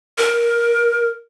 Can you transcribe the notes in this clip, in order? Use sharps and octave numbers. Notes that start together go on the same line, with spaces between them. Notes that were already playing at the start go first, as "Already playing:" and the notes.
A#4